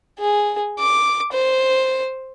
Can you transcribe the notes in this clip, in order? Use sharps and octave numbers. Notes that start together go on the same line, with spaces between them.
G#4
D6
C5